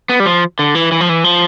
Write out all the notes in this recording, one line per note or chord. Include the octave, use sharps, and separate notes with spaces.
B3
G3
F3
D3
E3
E3
F3
E3
F3